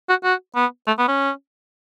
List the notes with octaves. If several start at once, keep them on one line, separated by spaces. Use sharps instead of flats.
F#4
F#4
B3
A3
B3
C#4